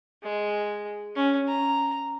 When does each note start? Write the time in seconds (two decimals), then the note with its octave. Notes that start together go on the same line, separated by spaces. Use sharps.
0.23 G#3
1.16 C#4
1.48 A#5